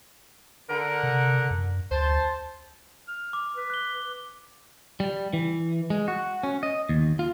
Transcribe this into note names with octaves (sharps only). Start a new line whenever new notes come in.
D3 A#4 F#5
C3
F#2
D2 C5 A5
F6
D6
B4
F#6 G7
G3
E3
G#3
F#4
C#4
D#5
D#2
F4